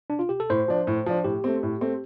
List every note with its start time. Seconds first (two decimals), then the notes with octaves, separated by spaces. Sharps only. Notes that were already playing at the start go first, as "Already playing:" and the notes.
0.10 D4
0.19 F4
0.29 G4
0.40 A4
0.50 A2 C5
0.68 F3 D4
0.87 A2
1.06 F3 D4
1.24 A2 G4
1.44 A3 C4
1.63 A2
1.81 A3 C4